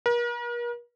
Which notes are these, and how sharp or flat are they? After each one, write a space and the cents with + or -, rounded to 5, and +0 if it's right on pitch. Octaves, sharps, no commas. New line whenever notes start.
A#4 +40